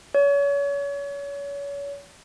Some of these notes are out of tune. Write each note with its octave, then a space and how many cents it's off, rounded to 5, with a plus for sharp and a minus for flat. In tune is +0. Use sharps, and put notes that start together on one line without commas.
C#5 +35